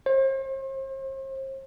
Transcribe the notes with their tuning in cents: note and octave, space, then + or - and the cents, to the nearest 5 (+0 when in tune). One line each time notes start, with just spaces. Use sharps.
C5 +40